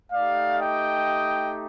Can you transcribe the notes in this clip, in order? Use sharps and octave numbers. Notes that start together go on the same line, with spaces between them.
A3 D#4 G4 D5 F5
D#5 G5